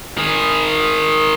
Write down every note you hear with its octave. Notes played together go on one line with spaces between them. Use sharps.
D#3 G#4